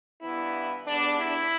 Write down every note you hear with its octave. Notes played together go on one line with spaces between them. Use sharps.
G2 E3 B3 E4
E2 D3 G3 B3 D4
E4